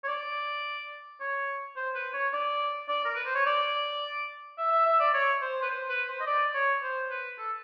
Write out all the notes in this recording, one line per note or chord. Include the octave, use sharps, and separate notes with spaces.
C#5
D5
C#5
C5
B4
C#5
D5
D5
A#4
B4
C5
C#5
D5
E5
E5
E5
D5
C#5
C5
B4
C5
B4
C5
D#5
D5
C#5
C5
B4
A4